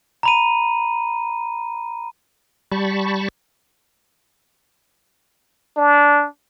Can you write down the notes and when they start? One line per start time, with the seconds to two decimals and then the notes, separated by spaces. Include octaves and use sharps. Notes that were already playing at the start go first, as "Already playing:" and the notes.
0.23 A#5 B5 D#7
2.72 G3 A5 B5 C#6
5.77 D4